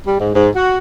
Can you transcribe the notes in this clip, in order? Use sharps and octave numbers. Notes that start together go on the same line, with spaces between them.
G3
G#2
G#2
F#4